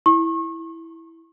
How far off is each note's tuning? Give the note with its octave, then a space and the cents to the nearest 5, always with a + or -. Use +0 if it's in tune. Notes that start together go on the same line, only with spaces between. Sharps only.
E4 +0 C#6 -35